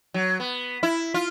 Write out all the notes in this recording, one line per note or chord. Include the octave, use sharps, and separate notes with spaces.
F#3
B3
E4
F4